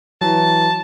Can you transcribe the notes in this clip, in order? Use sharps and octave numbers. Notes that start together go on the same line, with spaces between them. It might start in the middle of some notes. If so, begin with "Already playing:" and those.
E3 F#3 A5